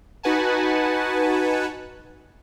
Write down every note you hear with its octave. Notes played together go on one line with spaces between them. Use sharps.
D#4 F#4 B4 F#5 G#5 A5